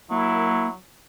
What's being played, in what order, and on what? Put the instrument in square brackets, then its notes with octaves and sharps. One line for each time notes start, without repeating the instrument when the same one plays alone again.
[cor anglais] F#3 [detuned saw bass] A#3 [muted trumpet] E4